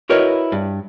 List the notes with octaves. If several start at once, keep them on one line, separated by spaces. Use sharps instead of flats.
E4 F#4 A#4 B4 C#5 D#5
G2